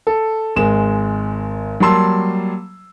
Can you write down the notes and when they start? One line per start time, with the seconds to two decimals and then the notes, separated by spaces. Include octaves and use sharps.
0.07 A4
0.56 G#1 G#3 E7
1.80 F#3 G3 A#3 A5 C6 E6